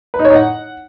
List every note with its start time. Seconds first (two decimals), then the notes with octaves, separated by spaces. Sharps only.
0.14 B4
0.19 D#4
0.25 C#5
0.30 D#4
0.36 F#5